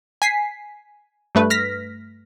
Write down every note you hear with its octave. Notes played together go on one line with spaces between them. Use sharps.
G#5 B6 C7
G2 A3 B4
F6 A#6 B6